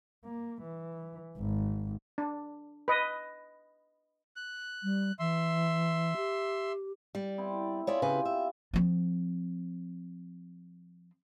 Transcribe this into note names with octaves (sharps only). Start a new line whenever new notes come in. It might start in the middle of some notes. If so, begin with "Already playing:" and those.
A#3
E3
G#1
D4
B4 D#5
F#6
G3
E3 E5 C6
G4
G3 D5
B3 C4 E4
E4 F4 G#4 C#5 D5 E5
C#3 C4 G4 B4 G#5
E5
F3 C4